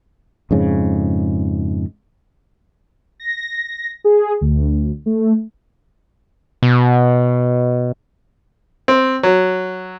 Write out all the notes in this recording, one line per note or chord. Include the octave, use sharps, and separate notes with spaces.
F2 G#2 C#3
A#6
G#4
D2
A3
B2
C4
F#3